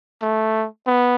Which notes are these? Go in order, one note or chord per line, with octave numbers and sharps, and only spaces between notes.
A3
B3